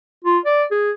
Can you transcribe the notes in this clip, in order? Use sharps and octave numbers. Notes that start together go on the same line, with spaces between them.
F4
D5
G#4